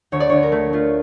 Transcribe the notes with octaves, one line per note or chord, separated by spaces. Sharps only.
D2 C#5
D5
D2 C#5
A#4
A3
A3 F4